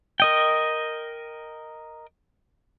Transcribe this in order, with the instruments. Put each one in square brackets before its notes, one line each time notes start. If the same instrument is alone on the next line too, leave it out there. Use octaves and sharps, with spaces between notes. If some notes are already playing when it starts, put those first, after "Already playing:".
[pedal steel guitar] A#4 D#5 G5